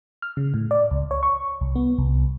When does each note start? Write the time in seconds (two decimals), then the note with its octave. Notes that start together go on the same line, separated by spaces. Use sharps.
0.22 F6
0.37 C#3
0.54 A2
0.71 D5
0.91 C#2
1.11 C#5
1.23 C#6
1.61 C2
1.76 B3
1.98 C2